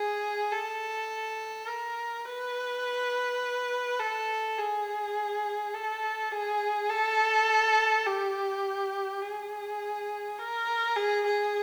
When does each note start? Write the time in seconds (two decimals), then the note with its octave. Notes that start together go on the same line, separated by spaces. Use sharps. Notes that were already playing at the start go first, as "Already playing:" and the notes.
Already playing: G#4
0.51 A4
1.67 A#4
2.25 B4
3.99 A4
4.58 G#4
5.74 A4
6.32 G#4
6.90 A4
8.06 G4
9.22 G#4
10.38 A#4
10.96 G#4
11.26 G#4